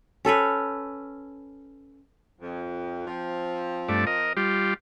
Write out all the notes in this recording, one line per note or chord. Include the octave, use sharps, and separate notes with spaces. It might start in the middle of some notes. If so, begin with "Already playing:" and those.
C#4 A4 B4 C#5
F2
F3 C4
G2 A3 D5
A#4 D#5
G3 F4 G4